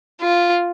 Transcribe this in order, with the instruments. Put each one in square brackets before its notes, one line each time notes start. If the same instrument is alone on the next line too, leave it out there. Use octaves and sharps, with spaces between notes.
[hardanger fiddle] F4